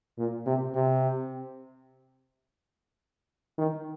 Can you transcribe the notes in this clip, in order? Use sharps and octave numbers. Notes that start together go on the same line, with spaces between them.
A#2
C3
C3
D#3